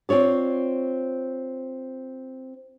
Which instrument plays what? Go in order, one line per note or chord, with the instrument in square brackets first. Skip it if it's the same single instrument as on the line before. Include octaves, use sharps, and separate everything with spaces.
[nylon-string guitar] C4 F4 C#5 D5